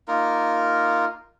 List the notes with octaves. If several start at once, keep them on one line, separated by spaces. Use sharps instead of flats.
A#3 D#4 F4 A#4